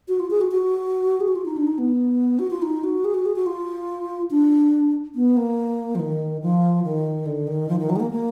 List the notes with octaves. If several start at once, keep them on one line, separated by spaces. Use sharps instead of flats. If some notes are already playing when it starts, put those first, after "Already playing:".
F#4
F4
G#4
F#4
F#4
G#4
F#4
F4
D#4
D4
D#4
B3
F#4
F4
D#4
F#4
G#4
F#4
G#4
F#4
F4
D4
B3
A#3
F3
D#3
F3
D#3
D3
D#3
F3
D#3
F#3
G#3
A#3
A#3